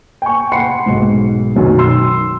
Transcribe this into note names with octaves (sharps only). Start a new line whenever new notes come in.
G5 G#5 C#6
F#5 B5 C6 C7 C#7
B1 G#2
B1 F#2 B2 D#3
C6 E6